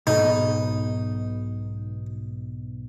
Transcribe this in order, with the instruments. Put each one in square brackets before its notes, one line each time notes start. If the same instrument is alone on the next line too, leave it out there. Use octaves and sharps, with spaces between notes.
[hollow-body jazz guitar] B1 G#2 B2 [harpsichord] D#4